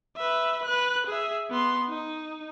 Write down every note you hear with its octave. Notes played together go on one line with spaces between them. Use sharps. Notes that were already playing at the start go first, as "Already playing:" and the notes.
B4 E5
B4 F#6
G#4 E5
B3 C6
D#4